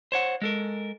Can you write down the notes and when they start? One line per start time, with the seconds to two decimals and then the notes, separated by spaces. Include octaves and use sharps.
0.12 C5 C#5 F#5
0.42 G#3 A4 A#4